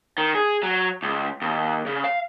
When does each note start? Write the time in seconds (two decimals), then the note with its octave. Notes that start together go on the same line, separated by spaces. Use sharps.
0.18 D#3
0.35 G#4
0.63 F#3
1.03 C#2
1.42 D#2
1.87 C#3
2.04 F5